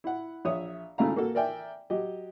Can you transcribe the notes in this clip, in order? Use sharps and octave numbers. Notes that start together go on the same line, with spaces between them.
E4 F#5
A#1 C#5 E5 D#6
G#1 C#3 A3 E4 F5 A#5
A#3 F#4 A4
A#4 D5 E5 G5 G#5
F#3 G4 D#5